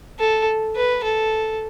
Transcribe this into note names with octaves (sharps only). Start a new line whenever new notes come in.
A4
B4
A4